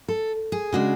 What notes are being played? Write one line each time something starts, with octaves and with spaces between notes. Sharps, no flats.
A4
G#4
C#3 G#3 D4 F#4